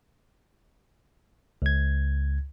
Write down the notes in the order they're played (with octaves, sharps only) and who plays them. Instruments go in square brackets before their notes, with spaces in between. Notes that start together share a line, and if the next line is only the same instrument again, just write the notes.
[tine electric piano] C#2 G#6